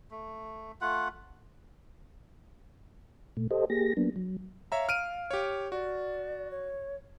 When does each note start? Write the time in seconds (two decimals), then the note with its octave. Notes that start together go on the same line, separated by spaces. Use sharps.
0.11 A3
0.81 A3 F4 F#5
3.37 A#2 A3
3.51 G4 A4 C5 D#5
3.70 A#3 G4 G#4 A#6
3.97 F#3 A#3 B3 D4
4.16 F#3
4.72 C#5 E5 F5 A#5
4.89 F6 D7 D#7
5.31 G4 C#5
5.72 F#4 D5
6.51 C#5